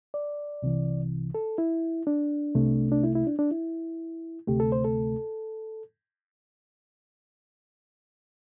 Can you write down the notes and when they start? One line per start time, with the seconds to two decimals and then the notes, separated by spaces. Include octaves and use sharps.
0.14 D5
0.62 C2 C3 E3
1.35 A4
1.58 E4
2.07 D4
2.55 C2 C3 A3
2.92 D4
3.03 E4
3.15 E4
3.27 D4
3.39 D4
3.51 E4
4.47 D2 C3 A3 G4
4.60 A4
4.72 C5
4.84 A4